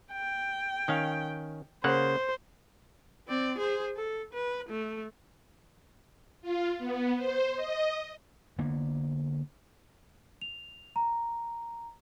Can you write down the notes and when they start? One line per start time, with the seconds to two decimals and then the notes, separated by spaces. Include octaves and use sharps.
0.12 G5
0.88 D#3 C#4 F5
1.84 C#3 A#3 C5 F#5
3.28 C4 D5
3.58 G#4 C5
3.96 A4
4.33 B4
4.69 A3
6.42 F4
6.78 B3
7.16 C5
7.55 D#5
8.58 D3 A#3 B3
10.41 F7
10.96 A#5